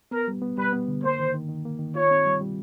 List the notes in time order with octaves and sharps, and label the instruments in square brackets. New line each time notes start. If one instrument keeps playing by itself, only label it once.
[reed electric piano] B3 [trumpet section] A#4
[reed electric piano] G3
B3
[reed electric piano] G3 [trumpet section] B4
[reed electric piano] B3
D3
[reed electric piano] A#3 [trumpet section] C5
[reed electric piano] D#3
D#3
D#3
A#3
D#3
[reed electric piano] F4 [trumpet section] C#5
[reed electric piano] C4
G3
G3